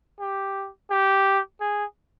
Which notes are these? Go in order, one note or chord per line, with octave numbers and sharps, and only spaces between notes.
G4
G4
G#4